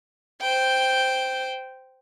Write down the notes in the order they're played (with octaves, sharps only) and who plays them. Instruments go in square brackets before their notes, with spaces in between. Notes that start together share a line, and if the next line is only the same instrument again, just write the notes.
[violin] C5 G5